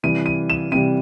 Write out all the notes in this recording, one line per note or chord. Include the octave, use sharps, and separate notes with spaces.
C3 E3 G3 D#7
D#7
E7
C3 E3 G3 D#7